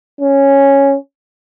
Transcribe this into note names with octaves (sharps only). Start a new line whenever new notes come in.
C#4